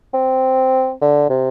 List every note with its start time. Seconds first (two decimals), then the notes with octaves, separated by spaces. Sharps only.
0.14 C4
1.01 D3
1.30 C3